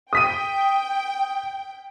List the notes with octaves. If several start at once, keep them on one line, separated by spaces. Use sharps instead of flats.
G5 D#6 B6 D#7